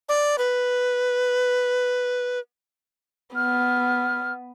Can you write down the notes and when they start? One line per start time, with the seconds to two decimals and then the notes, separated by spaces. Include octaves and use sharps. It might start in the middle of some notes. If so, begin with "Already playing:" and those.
0.09 D5
0.38 B4
3.35 B3 F6